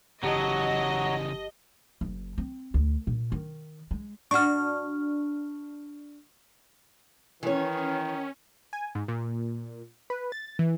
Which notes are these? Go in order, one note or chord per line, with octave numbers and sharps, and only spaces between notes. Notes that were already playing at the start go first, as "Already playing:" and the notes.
G1 C#3 E3 F#3 G4 D#5 A5
F#1
C4
D2
A#2
D#3
G#3
D4 F#4 C#6 F6
D#3 E3 C#4 C#5
G#5
G#2
A#2
B4
A6
E3